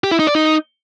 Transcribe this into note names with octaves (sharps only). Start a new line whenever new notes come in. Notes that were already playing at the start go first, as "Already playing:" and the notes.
G4
E4
D#4
D5
D#4